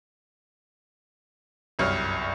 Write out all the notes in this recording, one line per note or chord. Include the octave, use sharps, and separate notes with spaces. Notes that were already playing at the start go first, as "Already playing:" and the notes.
G1 C2 F#2 C#5 F6